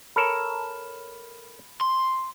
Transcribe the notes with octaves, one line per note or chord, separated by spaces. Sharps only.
A4 A#4 C#5 B5 F6 E7
C6